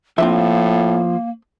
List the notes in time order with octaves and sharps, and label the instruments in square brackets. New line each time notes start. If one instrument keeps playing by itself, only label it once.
[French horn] A2 [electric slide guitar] F3 F4 [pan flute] A#3 [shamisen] C4 D4 E5